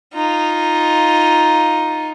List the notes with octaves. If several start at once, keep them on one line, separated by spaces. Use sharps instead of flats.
D#4 F4